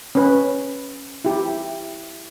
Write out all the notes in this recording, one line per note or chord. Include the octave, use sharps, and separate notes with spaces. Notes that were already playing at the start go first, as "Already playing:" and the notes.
C#4 B4
E4 G4